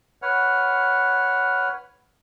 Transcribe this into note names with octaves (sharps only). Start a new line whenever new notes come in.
B4 C#5 F#5 F6